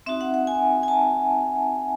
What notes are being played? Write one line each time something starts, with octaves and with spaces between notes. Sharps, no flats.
C4 D#4 F#4 E5
F#5
F#5
G#5
G#5
A5